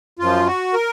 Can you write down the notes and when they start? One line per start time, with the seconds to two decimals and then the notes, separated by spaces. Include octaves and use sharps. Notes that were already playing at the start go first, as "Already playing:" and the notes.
0.19 F#2 F3 F4
0.46 F#4
0.74 A#4